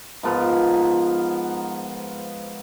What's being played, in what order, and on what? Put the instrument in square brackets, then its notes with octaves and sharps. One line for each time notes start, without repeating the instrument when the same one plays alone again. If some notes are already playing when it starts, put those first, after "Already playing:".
[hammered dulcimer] G#2 F3 B3 A#4